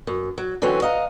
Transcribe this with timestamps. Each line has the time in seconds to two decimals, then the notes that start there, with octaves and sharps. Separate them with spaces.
0.07 F#2
0.38 F#3
0.62 D3 E3 F#3 C4 C#4
0.82 D#5 F5 F#5 A#5